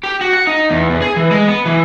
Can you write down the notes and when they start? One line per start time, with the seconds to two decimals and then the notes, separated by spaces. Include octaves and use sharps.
0.03 G4
0.21 F#4
0.33 F#5
0.47 D#4
0.70 E2
0.90 E2
1.02 G#4
1.16 E3
1.31 G#3
1.48 B3
1.66 E3